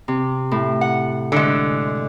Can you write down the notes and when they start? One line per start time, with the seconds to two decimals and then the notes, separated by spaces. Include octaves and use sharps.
0.08 C3
0.51 A2
0.81 F#5
1.32 D3 G#3